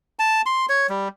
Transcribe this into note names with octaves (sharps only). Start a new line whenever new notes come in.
A5
C6
C#5
G3